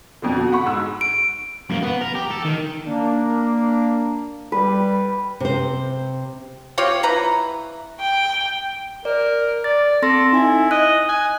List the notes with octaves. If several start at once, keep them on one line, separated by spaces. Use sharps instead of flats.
F2 B2 D3
F#4
F#5 B5 C#6
G#2 E6
D7
F#2 A#3
B3
A#4
G4
A4
D#3
A#3 D4
G3 B4
C3 C5
C4 F4 G4 C#5
E3 B4 A#5
G5
A#4 D5
D5 A6
C4 A4 C6 A#6
D#4 E4 G#5
D#5 F#6
G#5 F#6